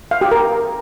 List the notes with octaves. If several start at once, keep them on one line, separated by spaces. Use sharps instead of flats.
F5
G4
A#4